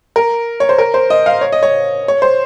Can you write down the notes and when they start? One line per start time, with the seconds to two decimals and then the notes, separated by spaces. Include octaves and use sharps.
0.16 A#4
0.60 C#5
0.69 C5
0.78 A#4
0.94 C5
1.10 D#5
1.26 F5
1.41 C#5
1.52 D#5
1.63 C#5
2.08 C#5
2.22 C5